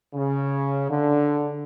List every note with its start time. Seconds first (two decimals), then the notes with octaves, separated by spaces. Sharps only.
0.15 C#3
0.90 D3